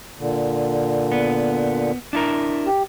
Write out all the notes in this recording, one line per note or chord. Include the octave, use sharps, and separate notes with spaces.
A#2 D3
B3
D4 E4 A#4
G4